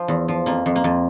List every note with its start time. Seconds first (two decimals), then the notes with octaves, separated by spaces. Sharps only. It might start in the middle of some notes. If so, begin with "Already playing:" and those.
Already playing: F3
0.08 E2
0.28 F3
0.46 F2 A#3
0.66 F2
0.76 A#3
0.84 F2